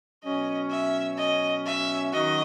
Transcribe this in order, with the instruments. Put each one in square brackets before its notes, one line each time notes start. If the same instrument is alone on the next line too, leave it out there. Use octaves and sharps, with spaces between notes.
[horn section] B2 F#3 C#4 [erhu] D#5
[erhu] E5
D#5
E5
[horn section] D#3 F#3 C#4 F#4 [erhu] D#5